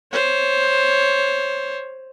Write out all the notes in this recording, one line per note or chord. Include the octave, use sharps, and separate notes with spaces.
C5 C#5